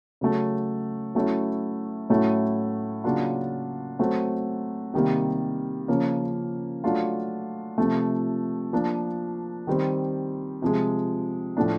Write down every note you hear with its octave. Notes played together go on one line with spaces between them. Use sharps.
C#3 F#3 A3
F#3 A3 C#4 E4
A2 F#3 A3 C#4 E4
C#3 F#3 A#3 D4 F4
F#3 A3 C4
C3 D#3 G3 A#3
C#3 F3 A#3 C#4
F#3 A3 D4 F4
C3 F3 A3
F3 A#3 D4
D#3 G3 C4
C3 F3 G#3
A2 F3 A3 D4